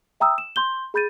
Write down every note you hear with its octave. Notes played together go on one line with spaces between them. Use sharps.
E5 G5 A#5 D#6 E6
E7
C6 G6 G7
G#4 B5 G6 A6 D#7